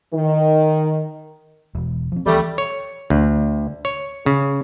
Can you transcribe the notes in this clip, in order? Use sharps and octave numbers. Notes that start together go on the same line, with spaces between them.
D#3
E1
F3 C4
D2 E3 G3 A3 C4
C#5
D2
C#5
C#3